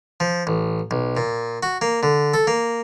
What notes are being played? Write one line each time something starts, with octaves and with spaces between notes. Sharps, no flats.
F3
A1
B1
A#2
F#4
A#3
D3
A4
A#3